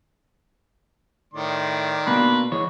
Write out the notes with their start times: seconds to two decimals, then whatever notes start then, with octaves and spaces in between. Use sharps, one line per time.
1.34 A2 D#3 D5 C6
2.07 B2 A#3 D4 B4
2.52 E3 G#3 C#5